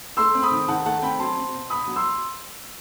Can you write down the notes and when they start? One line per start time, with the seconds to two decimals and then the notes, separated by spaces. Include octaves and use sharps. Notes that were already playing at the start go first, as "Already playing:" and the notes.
0.17 A3 C6 E6
0.35 C4
0.42 B5 D#6
0.51 D#3
0.68 D#3 F#5 A5
0.86 A3 F#5 A5
1.02 C4 G5 B5
1.19 F#3 A5 C6
1.37 C4
1.54 B2
1.70 B2 B5 D#6
1.88 F#3
1.96 C6 E6